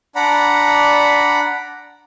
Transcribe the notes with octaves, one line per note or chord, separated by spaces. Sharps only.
D4 D5 F#5 A#5 B5